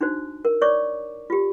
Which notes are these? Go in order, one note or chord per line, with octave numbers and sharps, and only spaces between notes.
D4 D#4 F#4 C5
A#4
C#5 D5 C#6 D6
F4 G4